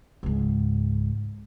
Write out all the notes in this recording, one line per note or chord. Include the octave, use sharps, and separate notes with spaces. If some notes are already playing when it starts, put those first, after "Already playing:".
C#2 G#2